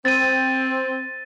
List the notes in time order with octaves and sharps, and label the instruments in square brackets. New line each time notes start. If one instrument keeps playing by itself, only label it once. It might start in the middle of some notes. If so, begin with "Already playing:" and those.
[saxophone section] C4 [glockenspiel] A6 D#7